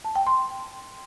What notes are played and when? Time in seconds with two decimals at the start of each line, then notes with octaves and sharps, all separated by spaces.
0.05 A5
0.16 G5
0.27 C6